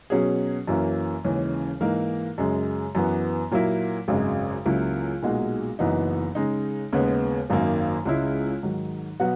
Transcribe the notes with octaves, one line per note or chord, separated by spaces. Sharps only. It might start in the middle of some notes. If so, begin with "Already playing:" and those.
B2 F#3 C#4 G#4
F#2 E3 A#3 C#4
D#2 C#3 E3 G#3 C#4
G#2 E3 A#3 D#4 A#4
F#2 C#3 G#3
F#2 E3 B3
A#2 F#3 A#3 E4
G#1 F#2 C#3 G#3
C#2 C#3 F#3 A#3 E4
B1 A#2 G#3 D#4 F#4
F#1 F#2 E3 B3 D#4
C#3 G#3 D#4
D#2 C#3 G#3 B3
G#1 F#2 D#3 A#3
C#2 C#3 G#3 C#4 E4
G#2 D#3 F#3
B2 F#3 B3 F#4